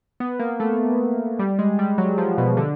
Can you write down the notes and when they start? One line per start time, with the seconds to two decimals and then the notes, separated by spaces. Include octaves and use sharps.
0.20 B3
0.39 A#3
0.60 A3
1.39 G3
1.59 G#3
1.79 G3
1.98 F#3
2.18 F3
2.38 B2
2.57 D3